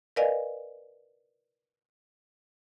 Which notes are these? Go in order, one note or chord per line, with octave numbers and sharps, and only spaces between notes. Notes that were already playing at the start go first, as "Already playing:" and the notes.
A#4 B4 D5 D#5 F5 G#5